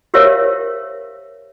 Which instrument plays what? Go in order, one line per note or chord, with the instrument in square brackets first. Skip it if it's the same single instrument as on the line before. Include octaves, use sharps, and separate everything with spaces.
[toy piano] G4 A#4 C5 C#5 E5 F5